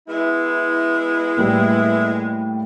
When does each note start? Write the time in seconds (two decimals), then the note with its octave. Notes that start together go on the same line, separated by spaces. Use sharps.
0.08 G#3 B3 E4
1.37 A2 G3 A#3